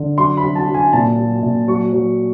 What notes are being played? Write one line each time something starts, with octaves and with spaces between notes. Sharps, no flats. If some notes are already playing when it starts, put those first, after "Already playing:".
Already playing: D3
F#3 C6
B5
F#3
A5
F#3
G#5
A#2 A5
F#3
A#2
F#3 C#6
F#3